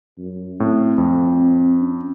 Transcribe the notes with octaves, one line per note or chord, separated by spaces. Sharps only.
F#2
A2 C4
F2
C#4